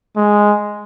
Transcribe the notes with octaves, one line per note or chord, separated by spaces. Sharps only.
G#3